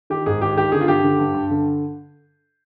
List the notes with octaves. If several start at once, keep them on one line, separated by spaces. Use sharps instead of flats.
D#3 G4
G#2 G#4
D#3 G4
D#3 G4
D3 G#4
F4
G2 G4
D3
G2
G2
D3